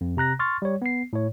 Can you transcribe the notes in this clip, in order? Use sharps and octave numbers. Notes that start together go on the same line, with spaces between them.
F2
C3 A#5 F#6 A#6
C6 C#6 F6 A6
G3 C#5
B3 C7
A2 C#5